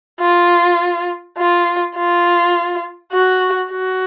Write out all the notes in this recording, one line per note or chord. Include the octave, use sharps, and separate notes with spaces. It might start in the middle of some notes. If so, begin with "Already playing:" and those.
F4
F4
F4
F#4
F#4